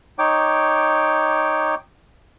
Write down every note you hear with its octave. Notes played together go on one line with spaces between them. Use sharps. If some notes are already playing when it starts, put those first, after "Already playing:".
D#4 C#5 G5 D6